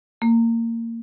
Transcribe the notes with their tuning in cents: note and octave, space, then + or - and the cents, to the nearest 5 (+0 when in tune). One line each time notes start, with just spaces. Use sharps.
A#3 -20